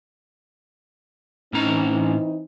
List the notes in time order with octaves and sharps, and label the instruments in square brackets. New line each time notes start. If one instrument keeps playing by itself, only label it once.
[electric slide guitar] A2 C#4 A#5 [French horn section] E3 C4 D#4